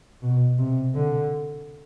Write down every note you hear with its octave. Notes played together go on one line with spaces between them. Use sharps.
B2
C3
D3